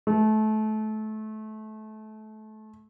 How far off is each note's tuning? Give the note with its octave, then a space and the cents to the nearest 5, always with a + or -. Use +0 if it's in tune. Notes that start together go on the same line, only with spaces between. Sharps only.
A3 -25